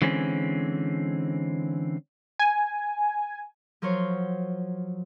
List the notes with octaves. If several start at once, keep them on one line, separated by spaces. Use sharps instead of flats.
D3 E3 G#3 C4 C#4
G#5
F3 F#3 A#4 C5 C#5